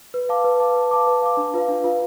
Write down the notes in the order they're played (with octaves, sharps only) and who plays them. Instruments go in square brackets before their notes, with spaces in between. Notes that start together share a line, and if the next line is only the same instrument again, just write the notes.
[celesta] B4
F5 A5 D6
B4
F5 A5 D6
B4
F5 A5 D6
B4
F5 A5 D6
D4
F4 B4 F5
D4
F4 B4 F5